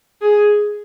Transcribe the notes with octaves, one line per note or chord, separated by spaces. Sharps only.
G#4